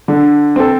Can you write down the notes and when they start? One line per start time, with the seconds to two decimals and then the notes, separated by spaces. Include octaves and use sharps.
0.08 D3
0.56 C4 A4